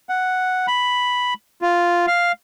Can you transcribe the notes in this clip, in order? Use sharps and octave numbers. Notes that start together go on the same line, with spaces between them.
F#5
B5
F4
F5